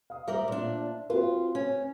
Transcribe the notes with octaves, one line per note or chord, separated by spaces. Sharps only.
F5 D#6
G3 A#4 C5 D5 E5
A#2 D4
C4 F4 F#4 B4
C#4